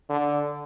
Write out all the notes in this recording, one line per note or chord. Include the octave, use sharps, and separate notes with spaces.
D3